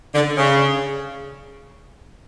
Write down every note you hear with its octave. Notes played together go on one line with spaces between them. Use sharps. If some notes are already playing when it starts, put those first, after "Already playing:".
D3
C#3